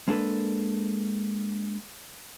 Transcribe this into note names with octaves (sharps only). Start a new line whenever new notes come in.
G#3 A#3 D4 A4 B4